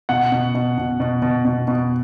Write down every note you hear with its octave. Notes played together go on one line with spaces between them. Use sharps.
B2 F#5
B2
B2
B2
B2
B2
B2
B2